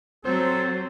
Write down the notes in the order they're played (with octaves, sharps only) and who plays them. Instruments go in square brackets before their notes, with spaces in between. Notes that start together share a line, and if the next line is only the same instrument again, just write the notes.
[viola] F#3 [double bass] C4 [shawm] A4 [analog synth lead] C5